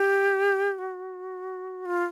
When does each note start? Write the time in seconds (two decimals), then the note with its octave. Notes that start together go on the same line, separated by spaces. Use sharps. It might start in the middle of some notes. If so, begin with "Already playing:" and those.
Already playing: G4
0.78 F#4
1.85 F4